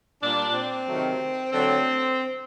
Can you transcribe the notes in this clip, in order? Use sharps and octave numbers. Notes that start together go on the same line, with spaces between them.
A#2 G3 D4
C4
C3 D#3 F#3 A3
D3 F#3 A3 C4